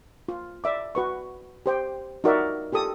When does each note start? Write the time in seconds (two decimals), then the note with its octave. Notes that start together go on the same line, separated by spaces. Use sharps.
0.28 F4
0.64 D5 E5 D6
0.95 F#4 B4 C#6
1.66 G4 C5 G5
2.24 D#4 F4 F#4 A#4 D5 E5
2.72 F4 G4 A4 D#6